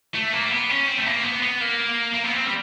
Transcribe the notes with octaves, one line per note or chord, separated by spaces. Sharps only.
A3
A#3
C4
B3
C#4
C4
A3
A#3
B3
B3
A#3
A#3
B3
C4
G3